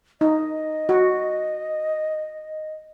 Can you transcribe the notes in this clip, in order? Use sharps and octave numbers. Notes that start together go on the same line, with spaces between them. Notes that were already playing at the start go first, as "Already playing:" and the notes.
D#4 D#5
F#4